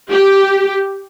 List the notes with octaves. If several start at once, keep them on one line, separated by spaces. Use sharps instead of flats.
G4